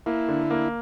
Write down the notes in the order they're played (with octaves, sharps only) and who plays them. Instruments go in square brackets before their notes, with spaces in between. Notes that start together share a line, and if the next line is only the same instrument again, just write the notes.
[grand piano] A#3 [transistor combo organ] E4
[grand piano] D3
A#3